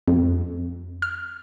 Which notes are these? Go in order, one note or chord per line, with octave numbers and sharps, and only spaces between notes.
F2
F6